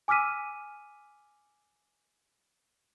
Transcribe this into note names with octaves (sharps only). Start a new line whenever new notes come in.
G#5 D6 E6 F6 B6 D#7